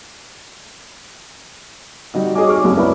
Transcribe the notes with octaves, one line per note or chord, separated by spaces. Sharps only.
G3 D#4 F#4
G#4 C#5 D#5 G#5 D6
C#6 D6 F6
F#1 C2
E4 A#4 B4 C#5 D5